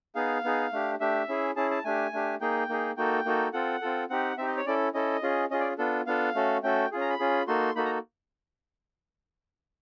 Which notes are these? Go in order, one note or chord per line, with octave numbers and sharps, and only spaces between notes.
B3 D#4 G#4 F5
B3 D#4 G#4
A3 D4 G4
A3 D4 G4 E5
C#4 E4 G#4
C#4 E4 G#4 A5
A5
A3 D4 G4 G#5
A3 D4 G4
A#3 D#4 G#4 G5
A#3 D#4 G#4
A#3 D#4 F#4 A4 G5
A#3 D#4 F#4 A4
C4 F4 A4 F#5
C4 F4 A4
C4 D#4 G4 F#5
C4 D#4 G4 E5
D#5
C#5
C#4 E4 A4 D5
C#4 E4 A4 D#5
C#4 F4 G#4
C#4 F4 G#4 D#5
D5
B3 D4 F4 A4
B3 D4 F4 A4 F5
A3 C#4 F#4 A4
A3 C#4 F#4 A4 G5
C#4 F4 G#4
A#5
B5
C#4 F4 G#4
A#3 D#4 F#4 A4 C6
A#3 D#4 F#4 A4 B5
A#5